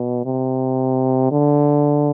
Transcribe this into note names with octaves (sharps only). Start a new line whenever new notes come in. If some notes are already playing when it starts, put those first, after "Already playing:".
Already playing: B2
C3
D3